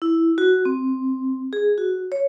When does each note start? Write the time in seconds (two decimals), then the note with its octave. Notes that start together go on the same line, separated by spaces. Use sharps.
0.02 E4
0.38 F#4
0.65 C4
1.53 G#4
1.78 F#4
2.12 C#5